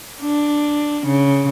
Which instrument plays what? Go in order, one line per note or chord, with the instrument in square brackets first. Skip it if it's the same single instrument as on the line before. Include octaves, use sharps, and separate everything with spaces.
[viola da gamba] D4
C#3